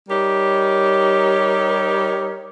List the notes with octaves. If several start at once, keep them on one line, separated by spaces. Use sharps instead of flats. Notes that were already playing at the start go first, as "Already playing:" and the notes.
G3 D#4 G4 A#4 C#5